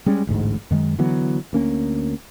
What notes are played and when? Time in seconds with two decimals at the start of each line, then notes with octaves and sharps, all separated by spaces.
0.06 G3 G#3 C#4
0.27 A1 D2 G#2
0.71 F#2 D#3 G#3
0.98 D3 E3 F#3 B3
1.53 D2 A#3 C#4